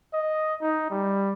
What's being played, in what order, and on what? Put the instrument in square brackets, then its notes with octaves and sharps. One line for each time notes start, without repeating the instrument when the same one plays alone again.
[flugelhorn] D#5
D#4
G3